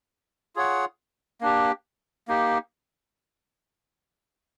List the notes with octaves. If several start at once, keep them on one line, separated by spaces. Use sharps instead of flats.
F4 G#4 C#5 F#5
A#3 D4 G4
A#3 D#4 G4